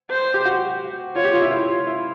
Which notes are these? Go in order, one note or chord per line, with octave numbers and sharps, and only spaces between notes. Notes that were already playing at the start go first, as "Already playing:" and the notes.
C5
G4
F#4
F4 C#5
G4
F4
E4
F4
E4